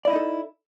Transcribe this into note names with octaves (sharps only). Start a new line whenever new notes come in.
D#4 E4 A4 D5 D#5